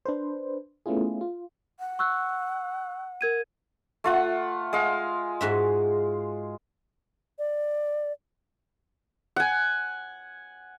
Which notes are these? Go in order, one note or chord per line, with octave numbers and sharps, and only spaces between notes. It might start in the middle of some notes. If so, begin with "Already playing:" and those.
D4 B4 C5
A3 B3 C#4 E4 F4 G#4
F4
F#5
C#6 E6 F#6
A#4 G#6 D#7
A3 F4 F#5
G#3 F5
G#2 F#4 E5
D5
F#5 G#5